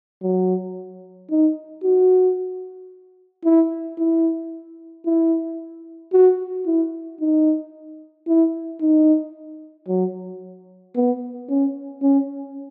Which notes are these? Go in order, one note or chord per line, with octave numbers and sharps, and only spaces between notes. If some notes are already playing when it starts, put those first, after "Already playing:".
F#3
D#4
F#4
E4
E4
E4
F#4
E4
D#4
E4
D#4
F#3
B3
C#4
C#4